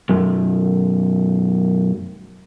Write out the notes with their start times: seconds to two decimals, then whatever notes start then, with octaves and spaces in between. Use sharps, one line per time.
0.09 B1 F#2